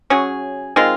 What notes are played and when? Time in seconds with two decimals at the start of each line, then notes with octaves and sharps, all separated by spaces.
0.10 F#3 C#4 G#4
0.76 D#3 G#3 C4 F4